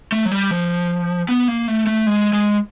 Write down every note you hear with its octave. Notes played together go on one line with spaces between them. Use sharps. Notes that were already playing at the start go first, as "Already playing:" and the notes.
A3
F#3
G3
F3
B3
A#3
A3
A3
G#3
G#3